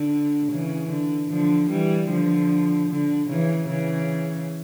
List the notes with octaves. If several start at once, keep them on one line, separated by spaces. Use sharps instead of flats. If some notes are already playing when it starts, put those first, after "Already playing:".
Already playing: D3
C#3 E3
D3
D3 F3
E3 G3
D3 F3
D3
C#3 E3
C#3 E3